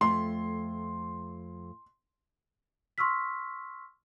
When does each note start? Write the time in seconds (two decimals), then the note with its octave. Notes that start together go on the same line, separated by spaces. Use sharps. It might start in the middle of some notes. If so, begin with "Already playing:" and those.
0.01 F2 A3 C6
2.98 C6 C#6 E6 F6 B6